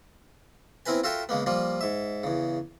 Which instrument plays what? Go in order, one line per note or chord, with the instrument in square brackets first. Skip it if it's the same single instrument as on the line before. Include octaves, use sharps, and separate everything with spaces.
[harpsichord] B3 C4 E4 A#4 B4 G#5
F4 F#4 A4 A#4 E5 G5
C#3 G#3 A#3 B3
F3 G3 A#3 F4
G#2 E5
E2 C#3